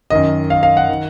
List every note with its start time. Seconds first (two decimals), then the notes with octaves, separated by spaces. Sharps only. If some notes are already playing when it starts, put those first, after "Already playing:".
0.10 F#2 D#3 D#5
0.50 F5
0.63 F5
0.77 F#5
0.89 D#3